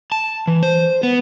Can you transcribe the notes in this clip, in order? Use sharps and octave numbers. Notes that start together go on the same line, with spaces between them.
A5
E3
C5
B3